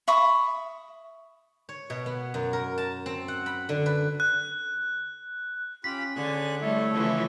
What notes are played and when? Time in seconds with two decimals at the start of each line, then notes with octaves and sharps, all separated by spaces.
0.08 E5 B5 C#6 D#6
1.69 C#5
1.90 B2
2.06 B3
2.34 F#2
2.53 A#4
2.78 A5
3.06 C4
3.28 F#5
3.46 B5
3.69 D3
3.86 B4
4.20 F#6
5.84 C#4 F4 G4 B5 B6
6.16 D3 G#4 C#5 F#6
6.61 G3 A3 E4 A4 C#5
6.92 C#3 E3 F3